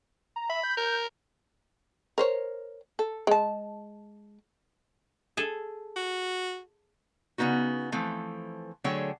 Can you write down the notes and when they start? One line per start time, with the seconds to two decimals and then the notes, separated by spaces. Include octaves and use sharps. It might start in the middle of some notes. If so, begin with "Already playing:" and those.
0.36 A#5
0.50 E5 B5
0.64 G6
0.77 A#4
2.18 A#4 C5 C#5
2.99 A4
3.27 G#3 A5
5.37 G#4 A4
5.96 F#4
7.38 C#3 A3 B3 D#4 F#4
7.92 E3 F3 A3 C4
8.84 D3 F#3 A3 G#4 C#5 G5